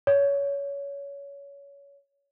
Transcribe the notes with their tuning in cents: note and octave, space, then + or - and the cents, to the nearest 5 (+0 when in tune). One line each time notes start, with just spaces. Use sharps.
C#5 +20